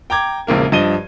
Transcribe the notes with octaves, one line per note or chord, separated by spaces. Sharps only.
G5 A#5 D6 G#6
E1 A#1 C#3 A#3 A#4
G2 F3 D#5 D#7 G7